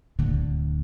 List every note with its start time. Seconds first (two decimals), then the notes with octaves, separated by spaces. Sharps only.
0.19 D1 D3